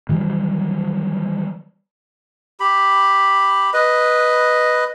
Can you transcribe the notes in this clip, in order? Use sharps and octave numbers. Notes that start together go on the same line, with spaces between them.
D#3 E3 F#3 G3
G4 B5
B4 D#5